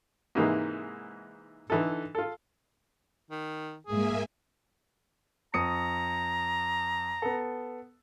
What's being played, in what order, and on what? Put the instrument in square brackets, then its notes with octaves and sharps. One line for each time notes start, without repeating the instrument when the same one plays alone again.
[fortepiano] G#2 C3 E3 G#3 A#3 D#4
D3 E3 D#4 A4
F4 A4
[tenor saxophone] D#3
[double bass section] G#2 G#3 [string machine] A#3 E5 G#5 [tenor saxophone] G#4
[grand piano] F2 D#6 C#7 [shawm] A#5
[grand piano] B3 A4